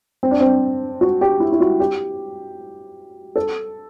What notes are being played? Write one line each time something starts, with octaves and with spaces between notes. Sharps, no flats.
C4
D4
C4
F#4
G4
E4
E4
F#4
G4
A4